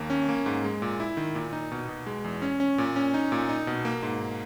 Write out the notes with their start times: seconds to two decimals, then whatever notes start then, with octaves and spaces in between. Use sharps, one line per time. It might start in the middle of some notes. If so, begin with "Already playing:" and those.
Already playing: D#2 A#3
0.10 C#4
0.29 A#3
0.46 G#2
0.64 G#3
0.82 A#2
1.00 E4
1.17 D#3
1.35 A#2
1.53 D#4
1.72 B2
1.89 B2
2.07 G#3
2.24 E2
2.42 C#4
2.60 C#4
2.78 A#2
2.96 C#4
3.14 D#4
3.32 A#2
3.49 D#4
3.67 B2
3.85 A#3
4.03 G#2